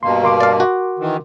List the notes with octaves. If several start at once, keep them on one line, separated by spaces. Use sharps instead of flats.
G2 B2 A#3 C6
A#4 C6 D6
D5 F5
F#4
D#3 E3